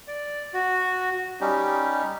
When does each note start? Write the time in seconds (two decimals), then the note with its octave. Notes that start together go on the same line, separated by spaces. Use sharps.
0.07 D5
0.53 F#4
1.41 G3 C#4 D#4 G4